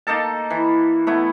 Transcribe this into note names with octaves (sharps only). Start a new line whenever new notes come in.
A#3 D#4 A4 A5
E3
A3 B3 E4